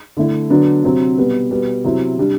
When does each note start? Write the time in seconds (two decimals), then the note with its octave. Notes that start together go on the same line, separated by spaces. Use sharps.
0.17 D3 A3 E4
0.50 D3 F#3 B3 D4
0.84 C3 F#3 C4
1.18 B2 G3 B3
1.51 B2 G3 B3
1.84 C3 F#3 C4 E4
2.17 C3 G3 D4